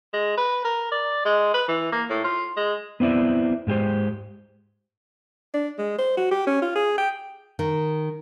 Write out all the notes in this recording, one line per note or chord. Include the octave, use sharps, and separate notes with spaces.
G#3
B4
A#4
D5
G#3
B4
E3
A#3
A2
F4
G#3
B3 C4 E4 D5 E5
G#2 G#3 G4 C5
D4
G#3
C5
F#4
G4
C#4
F4
G#4
G5
D#3